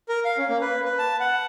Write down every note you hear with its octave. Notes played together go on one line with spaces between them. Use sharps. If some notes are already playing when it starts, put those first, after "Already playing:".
A#4
F5
C#4
A#3
B4
B4
A5
F#5